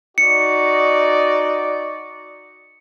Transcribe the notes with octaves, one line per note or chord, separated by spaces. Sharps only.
D#4 F#4 D5 C#7